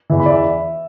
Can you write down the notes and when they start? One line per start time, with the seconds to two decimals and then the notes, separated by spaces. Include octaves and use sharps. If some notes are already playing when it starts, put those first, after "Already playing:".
0.10 E2 E3 E5
0.20 B5
0.26 D5
0.30 E5